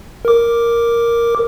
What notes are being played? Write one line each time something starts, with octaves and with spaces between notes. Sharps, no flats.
A#4 D6